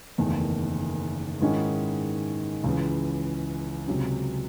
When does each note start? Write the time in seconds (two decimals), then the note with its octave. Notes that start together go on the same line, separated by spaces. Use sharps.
0.18 F#1 E2 D#3 A3
1.41 G#2 D#3 G#3 C#4 E4
2.64 C#2 C#3 E3
3.87 C#2 C3 F#3 C#4